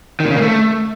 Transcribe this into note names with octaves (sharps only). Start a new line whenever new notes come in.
D#3
A#2
C#3
A#3
A3